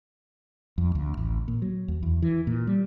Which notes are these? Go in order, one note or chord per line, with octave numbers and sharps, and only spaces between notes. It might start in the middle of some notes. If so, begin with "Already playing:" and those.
F2
D2
A1
A#2
F#3
D#2
E2
E3
A#2
G3